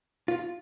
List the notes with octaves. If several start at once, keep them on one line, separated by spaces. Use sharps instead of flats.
F4